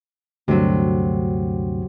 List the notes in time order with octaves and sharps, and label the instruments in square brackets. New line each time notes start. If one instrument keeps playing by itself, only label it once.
[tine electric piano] D2 G2 [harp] C3 F#3